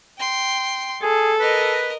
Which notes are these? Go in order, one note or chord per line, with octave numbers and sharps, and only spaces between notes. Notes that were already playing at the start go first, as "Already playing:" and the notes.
G5 C6
G#4 A4
A#4 B4 D#5